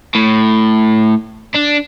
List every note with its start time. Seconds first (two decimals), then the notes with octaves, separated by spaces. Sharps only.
0.15 A2
1.55 D4